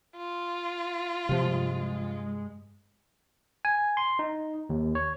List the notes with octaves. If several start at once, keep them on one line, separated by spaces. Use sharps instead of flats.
F4
G2 C3 F3 G#3
G#5
C6
D#4
D#2
C#5